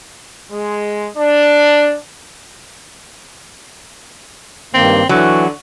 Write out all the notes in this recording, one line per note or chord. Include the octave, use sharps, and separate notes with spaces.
G#3
D4
G2 D#3 A#3 C4
D3 E3 F#3